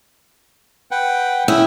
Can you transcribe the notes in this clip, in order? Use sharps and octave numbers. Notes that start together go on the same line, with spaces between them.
B4 F#5 G5
C#4 E4 G5 D#6